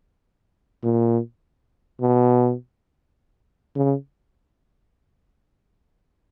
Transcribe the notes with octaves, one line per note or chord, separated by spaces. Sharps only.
A#2
B2
C#3